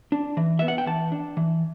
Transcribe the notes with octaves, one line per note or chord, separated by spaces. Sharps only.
D4
E3
B3 E5
F#5
G5
E3 A5
D4
E3